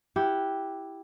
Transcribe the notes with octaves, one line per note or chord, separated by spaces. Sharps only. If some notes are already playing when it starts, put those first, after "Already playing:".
E4 G4 F#5